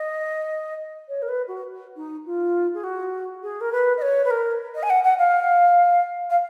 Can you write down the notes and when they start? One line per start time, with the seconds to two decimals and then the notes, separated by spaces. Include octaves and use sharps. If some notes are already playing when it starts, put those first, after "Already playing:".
Already playing: D#5
1.09 C#5
1.22 A#4
1.28 B4
1.48 F#4
1.96 D#4
2.26 F4
2.74 G#4
2.84 F#4
3.43 G#4
3.61 A#4
3.72 B4
3.97 D#5
4.02 C#5
4.25 B4
4.31 A#4
4.75 D#5
4.83 G#5
4.90 F#5
5.04 F#5
5.19 F5
6.30 F5